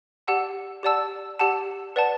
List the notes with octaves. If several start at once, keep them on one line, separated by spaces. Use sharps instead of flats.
G4 D5 F#5 A5 E6
G4 D5 F#5 A5 E6
G4 D5 F#5 A5 E6
B4 D5 F#5 A5